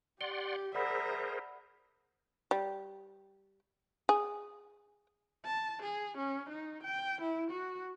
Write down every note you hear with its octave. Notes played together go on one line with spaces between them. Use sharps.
G4 D5 F#5 C6 G7
G#4 A#4 C5 D5 E5 F#5 A#5 B5
G3
G#4
A5
G#4
C#4
D#4
G5
E4
F#4